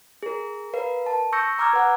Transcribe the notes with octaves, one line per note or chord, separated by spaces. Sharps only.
G#4 A#4
A#4 B4 F5
A5
C#6 E6 G6 A#6 C#7
A#5 D6 E6 F6 G#6
B4 F#5